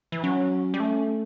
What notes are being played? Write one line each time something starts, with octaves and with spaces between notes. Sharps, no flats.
E3
F#3 C#4
G3
A3